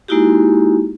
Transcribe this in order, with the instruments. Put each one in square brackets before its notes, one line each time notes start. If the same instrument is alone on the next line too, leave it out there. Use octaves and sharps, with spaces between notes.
[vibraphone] G#3 A#3 D#4 E4 F#4 G4